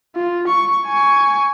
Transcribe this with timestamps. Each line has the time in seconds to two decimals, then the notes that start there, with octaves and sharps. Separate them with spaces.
0.16 F4
0.48 C#6
0.86 G#5 C#6